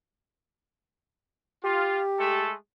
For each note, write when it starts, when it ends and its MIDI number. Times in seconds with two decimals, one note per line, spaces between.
1.64 2.00 65
1.64 2.46 67
2.18 2.53 56
2.18 2.53 57
2.18 2.53 69